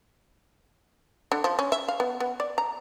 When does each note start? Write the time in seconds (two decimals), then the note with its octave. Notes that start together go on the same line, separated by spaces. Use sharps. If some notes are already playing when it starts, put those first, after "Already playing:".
1.32 D3
1.44 F3
1.59 C#4
1.72 E5
1.88 F5
2.00 B3
2.20 B3
2.40 D5
2.58 A#5